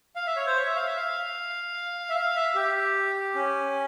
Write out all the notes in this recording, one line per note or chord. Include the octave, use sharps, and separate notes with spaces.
F5
E5
C#5
C5
C#5
E5
F5
E5
F5
E5
F5
E5
G4
C#4